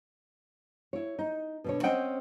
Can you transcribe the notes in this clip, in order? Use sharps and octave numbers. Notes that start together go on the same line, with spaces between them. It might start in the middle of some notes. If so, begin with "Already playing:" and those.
E4 C#5
D#4
B2 D3 C#5
C4 C#4 C5 D#5 F#5 G5